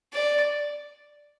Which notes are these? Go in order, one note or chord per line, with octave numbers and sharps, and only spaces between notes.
D5